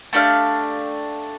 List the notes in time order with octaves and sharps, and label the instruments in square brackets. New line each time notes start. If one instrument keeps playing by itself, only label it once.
[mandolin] A3 D4 G4 F5